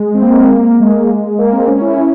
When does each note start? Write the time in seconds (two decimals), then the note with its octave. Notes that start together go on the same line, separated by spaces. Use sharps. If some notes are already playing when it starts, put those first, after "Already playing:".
Already playing: G#3
0.14 C4
0.22 A#3
0.51 A#3
0.80 G#3
1.38 A#3
1.53 C4
1.67 C#4
1.81 E4
1.96 C#4